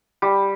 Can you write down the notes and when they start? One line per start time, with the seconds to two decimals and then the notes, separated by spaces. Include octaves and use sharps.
0.22 G3